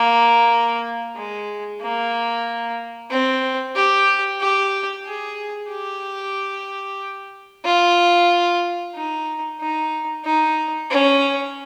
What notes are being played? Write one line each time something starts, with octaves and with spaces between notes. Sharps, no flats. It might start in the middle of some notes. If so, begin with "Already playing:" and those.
Already playing: A#3
G#3
A#3
C4
G4
G4
G#4
G4
F4
D#4
D#4
D#4
C#4